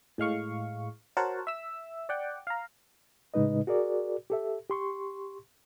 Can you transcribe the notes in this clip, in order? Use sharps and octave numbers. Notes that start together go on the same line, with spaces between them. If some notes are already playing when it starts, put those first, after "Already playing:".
A2 G#3 F5 C#6
F#4 A#4 C5 C#5 F#5 A5
E5 E6
D5 F#5 G5
F5 A#5
A2 C#3 G#3 D#4 B4 D#5
F#4 G#4 A#4 D5
G4 A4 E5
G4 C6 C#6